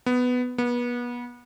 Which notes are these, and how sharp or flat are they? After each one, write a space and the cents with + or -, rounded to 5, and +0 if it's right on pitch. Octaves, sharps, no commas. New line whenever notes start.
B3 +10
B3 -30